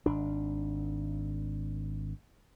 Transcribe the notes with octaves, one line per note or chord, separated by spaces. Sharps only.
G#1 D4